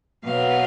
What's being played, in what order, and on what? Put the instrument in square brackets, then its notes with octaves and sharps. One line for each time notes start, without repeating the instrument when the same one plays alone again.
[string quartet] B2 F#3 B3 F5